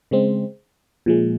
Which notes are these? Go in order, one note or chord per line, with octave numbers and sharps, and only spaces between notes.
C#3 G#3 C4
A#2 F3 G#3